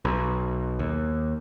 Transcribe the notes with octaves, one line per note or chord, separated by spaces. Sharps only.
B1
D#2